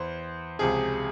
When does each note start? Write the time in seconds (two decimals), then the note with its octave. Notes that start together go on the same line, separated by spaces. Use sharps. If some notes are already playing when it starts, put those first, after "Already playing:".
Already playing: E2 E3 C5
0.59 C#2 C3 F3 G#4